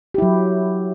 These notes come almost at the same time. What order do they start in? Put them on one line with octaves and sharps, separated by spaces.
G4 E4 F#3